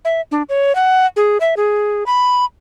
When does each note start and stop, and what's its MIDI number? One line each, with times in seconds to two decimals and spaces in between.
0.05 0.21 76
0.31 0.43 62
0.49 0.75 73
0.75 1.06 78
1.16 1.38 68
1.40 1.55 76
1.57 2.04 68
2.06 2.45 83